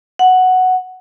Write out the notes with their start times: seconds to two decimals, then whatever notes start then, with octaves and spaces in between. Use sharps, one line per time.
0.19 F#5